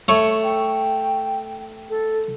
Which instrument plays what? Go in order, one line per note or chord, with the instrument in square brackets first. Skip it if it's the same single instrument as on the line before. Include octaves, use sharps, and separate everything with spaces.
[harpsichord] A3 C#5 C#6
[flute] G5
A4